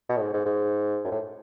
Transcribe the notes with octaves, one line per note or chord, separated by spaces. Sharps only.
B2
A2
G#2
G#2
G#2
F#2
A2